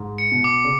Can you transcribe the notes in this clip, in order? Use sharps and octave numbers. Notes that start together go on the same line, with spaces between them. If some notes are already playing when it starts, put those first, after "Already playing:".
Already playing: G#2
C#7
B2
D6
C#3